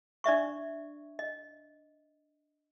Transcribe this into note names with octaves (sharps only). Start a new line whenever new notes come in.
D4 D5 E5 C#6
D#5